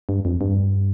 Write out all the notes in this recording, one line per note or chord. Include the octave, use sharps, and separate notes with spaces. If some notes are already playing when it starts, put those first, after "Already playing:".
G2
F2
G2